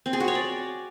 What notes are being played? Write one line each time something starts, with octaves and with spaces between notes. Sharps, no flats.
C4
G#4
F#4
C#5
D5